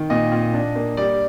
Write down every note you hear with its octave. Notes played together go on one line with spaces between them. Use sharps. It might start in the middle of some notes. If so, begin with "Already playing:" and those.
Already playing: D#3
A#2 D#5
A#2
D4
A#3
G3 D5